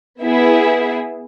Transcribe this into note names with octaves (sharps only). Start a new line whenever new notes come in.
B3 E4 G#4 E5